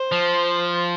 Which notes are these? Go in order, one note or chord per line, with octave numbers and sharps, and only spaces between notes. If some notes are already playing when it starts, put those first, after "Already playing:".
Already playing: C5
F3